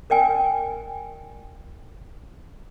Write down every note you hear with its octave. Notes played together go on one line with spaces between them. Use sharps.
A#4 D5 G5 G#5